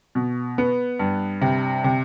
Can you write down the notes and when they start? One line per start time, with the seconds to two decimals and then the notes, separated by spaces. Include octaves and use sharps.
0.15 B2
0.58 B3
0.99 G2
1.41 C3
1.84 C3